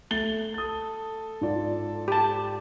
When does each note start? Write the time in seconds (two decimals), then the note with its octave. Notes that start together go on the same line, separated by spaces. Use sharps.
0.11 A3 A6 G7
0.54 A4 D#6 A6
1.41 G#2 F4 D5
2.08 G4 A5